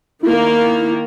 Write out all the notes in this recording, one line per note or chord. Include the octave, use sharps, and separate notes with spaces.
D#3 A#3 E4